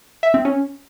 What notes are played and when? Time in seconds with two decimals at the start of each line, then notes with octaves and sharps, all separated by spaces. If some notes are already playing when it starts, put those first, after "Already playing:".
0.23 E5
0.34 C4
0.45 C#4